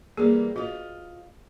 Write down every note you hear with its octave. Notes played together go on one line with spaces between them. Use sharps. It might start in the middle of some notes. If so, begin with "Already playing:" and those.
E3 G3 A#3 G#4
F4 F#4 D#5